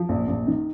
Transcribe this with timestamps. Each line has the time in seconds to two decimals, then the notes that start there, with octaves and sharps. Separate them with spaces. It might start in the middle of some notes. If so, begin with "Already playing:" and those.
Already playing: F3
0.09 A#1
0.28 A#1
0.47 D#3